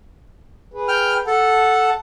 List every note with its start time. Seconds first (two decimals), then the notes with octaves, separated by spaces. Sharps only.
0.74 G#4 B4
0.88 G5 F6
1.27 A4 F#5 A5